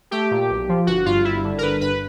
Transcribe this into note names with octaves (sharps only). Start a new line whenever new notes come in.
A3 G4
A#2
B1
F3
G1 F#4
G2 F4
G1 E4
D3
A#4
G1 B4
G2 B4